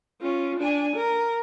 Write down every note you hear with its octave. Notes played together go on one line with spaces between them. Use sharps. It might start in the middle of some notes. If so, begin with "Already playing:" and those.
C#4 F4
D4 G#5
A#4